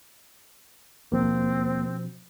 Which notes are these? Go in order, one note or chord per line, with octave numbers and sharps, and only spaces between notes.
D#2 B2 F3 A#3 C4 D4